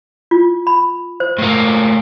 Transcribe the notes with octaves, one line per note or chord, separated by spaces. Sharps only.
F4
B5
C5
A2 A#3